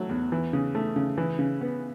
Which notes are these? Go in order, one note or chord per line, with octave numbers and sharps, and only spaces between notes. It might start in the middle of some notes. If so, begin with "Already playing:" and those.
Already playing: F#3 A3
E2
E3
C#3
A3
C#3
E3
C#3
B3